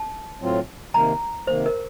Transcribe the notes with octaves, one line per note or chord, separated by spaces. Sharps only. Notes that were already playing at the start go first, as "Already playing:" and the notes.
Already playing: A5
A2 F#3 C4 F4
C3 D#3 A#3 A#5
C3 D#3 A#3 C5
A#4